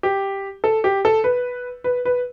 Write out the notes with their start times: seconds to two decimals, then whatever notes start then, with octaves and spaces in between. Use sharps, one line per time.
0.03 G4
0.64 A4
0.84 G4
1.05 A4
1.24 B4
1.84 B4
2.05 B4